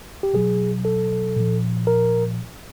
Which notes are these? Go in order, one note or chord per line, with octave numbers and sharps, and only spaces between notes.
G4
B2 F#3 G#4
A4
A#2 F3
A#4